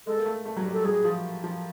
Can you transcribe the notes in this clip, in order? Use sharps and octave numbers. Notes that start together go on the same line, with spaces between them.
G#3 A4
A#3
A3
A3
F#3
G3
A4
F#3 G#4
F3
F3